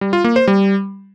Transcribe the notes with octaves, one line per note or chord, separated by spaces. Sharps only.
G3
F4
A#3
C5
G3